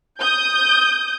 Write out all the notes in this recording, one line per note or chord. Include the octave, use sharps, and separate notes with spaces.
D#6 G6